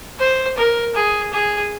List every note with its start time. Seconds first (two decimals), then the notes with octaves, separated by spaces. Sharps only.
0.20 C5
0.57 A#4
0.95 G#4
1.32 G#4